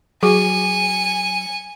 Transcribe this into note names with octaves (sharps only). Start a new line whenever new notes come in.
F#3 F#4 G#4 G#5 C#7